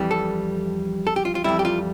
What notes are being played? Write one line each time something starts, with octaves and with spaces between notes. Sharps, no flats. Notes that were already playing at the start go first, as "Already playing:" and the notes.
Already playing: F2 E3 G3
A4
A4
G4
F4
F4
F2 E3 G3 E4
G4
F4